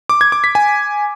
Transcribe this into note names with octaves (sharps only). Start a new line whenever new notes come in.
D6
G#6
D6
B6
G#5